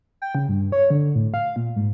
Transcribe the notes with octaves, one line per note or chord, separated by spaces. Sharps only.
G5
C#3
G2
C#5
D3
A2
F5
A#2
G#2